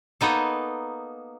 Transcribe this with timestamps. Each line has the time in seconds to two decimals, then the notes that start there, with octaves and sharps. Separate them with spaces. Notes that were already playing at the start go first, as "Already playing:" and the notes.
0.21 A#3 B3 D#4 A4